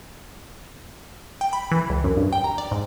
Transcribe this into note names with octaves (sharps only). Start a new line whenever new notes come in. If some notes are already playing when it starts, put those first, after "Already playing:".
G5
B5
E3
C#2
F#2
G2
G5
A#5
D5
G#2